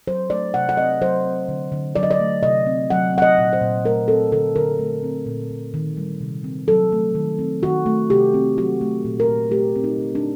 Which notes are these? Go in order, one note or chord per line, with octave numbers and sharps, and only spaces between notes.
F#3 C5
A3 D5
C3 F#5
F#5
C4 D#5
F#3 C5
C4
D3
D3
F#3 D5
D#5
D5
A3
C3 D#5
C4
F#3 F#5
C4 F#5
D#5
A#2
C5
A#2
A3 A#4
C4 A4
D3 A4
D3 A#4
A3
C4
A#2
A#2
D#3
G3
C3
C4
F#3 A4
A3
D#3
C4
D#3 F#4
A3
C3 G4
C4
F#3 F#4
A3
A#2
A#4
A#2
A3 G4
C4
D#4
D3
D4